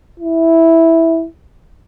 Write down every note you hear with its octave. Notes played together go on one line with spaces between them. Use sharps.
E4